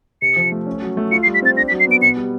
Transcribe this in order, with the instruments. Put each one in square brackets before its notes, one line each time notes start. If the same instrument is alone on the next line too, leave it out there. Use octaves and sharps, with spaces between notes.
[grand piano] C3 [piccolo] C#7
[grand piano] F3
A3
C#4
F#3
A3
[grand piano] F4 [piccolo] C#7
[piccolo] C7
[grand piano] G3
[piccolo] B6
[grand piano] C4 [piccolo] A6
[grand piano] D4 [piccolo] A#6
[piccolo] B6
[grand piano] F#3
[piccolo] C7
[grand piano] B3 [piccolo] D7
[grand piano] B2 [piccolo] C#7
[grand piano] G3